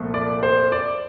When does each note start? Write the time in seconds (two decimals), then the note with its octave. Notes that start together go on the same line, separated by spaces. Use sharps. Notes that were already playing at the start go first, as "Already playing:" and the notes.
Already playing: C2 A#2 F3 A3
0.14 D5
0.43 C5
0.72 D5